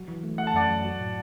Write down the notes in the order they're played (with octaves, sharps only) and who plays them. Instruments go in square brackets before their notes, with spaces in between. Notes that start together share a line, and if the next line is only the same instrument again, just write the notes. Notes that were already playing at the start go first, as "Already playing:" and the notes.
Already playing: [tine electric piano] F#3 F#4
E3
A3
[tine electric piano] A3 [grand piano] F#5
[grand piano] A5
[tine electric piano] F#2 [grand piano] D5 F#5
[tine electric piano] F#3
F#4
A2